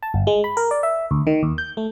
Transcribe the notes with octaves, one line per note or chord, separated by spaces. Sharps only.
A5
G1
G#3
B5
A#4
D5
E5
D2
D#3
D#2
G6
A3